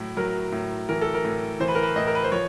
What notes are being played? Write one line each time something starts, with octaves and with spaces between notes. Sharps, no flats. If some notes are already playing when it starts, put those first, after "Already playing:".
Already playing: A2 F#3 E4
F#3 A#4
A2
E3 A#4
A4
A#4
A2
E3 C5
B4
A#4
B4
A2 D#5
A#4
B4
C5
F3 C#5